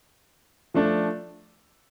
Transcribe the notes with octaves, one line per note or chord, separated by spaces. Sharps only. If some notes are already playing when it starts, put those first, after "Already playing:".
F3 A3 D4